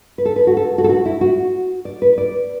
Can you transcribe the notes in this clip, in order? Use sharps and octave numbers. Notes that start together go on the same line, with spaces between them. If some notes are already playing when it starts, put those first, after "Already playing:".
B4
A4
B4
F#4
A4
F#4
A4
F#4
E4
F#4
D5
B4
D5